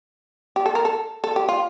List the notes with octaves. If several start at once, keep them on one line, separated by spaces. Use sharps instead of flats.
G4
A4
A#4
A4
A4
G4
F4